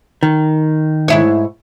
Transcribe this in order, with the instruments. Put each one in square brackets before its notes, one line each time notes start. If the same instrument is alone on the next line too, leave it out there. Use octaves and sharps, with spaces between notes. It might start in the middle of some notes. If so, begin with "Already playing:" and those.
[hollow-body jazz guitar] D#3
[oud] G#2 E4 C#5